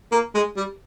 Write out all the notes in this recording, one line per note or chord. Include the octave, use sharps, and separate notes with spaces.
A#3
G#3
G3